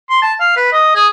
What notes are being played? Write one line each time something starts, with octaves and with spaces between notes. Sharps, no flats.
C6
A5
F5
B4
D#5
G#4